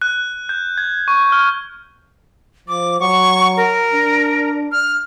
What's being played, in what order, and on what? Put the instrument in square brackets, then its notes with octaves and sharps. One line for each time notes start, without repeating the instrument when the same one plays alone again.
[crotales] F#6
G6
G#6
C#6
F6
[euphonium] F3 [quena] D6
[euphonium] F#3 [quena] C#6
[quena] A#4
[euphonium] D4
[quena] F6